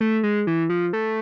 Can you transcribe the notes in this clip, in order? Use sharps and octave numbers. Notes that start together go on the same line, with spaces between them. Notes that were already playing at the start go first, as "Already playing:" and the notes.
A3
G#3
E3
F3
A3